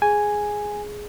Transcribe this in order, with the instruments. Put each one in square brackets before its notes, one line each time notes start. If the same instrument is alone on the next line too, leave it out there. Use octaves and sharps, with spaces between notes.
[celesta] G#4 [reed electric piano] G#5